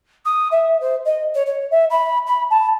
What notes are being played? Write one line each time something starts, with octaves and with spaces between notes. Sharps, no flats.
D#6
E5
C5
D#5
C#5
C#5
E5
B5
B5
A5